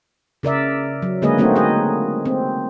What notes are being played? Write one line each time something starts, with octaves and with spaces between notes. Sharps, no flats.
C#3 A#4 D5 E5
F#3
D3 G#3 A#3 G#4 B4 D#5
A3 A#3 C4 D#4 F#4
G#4 D#5
C4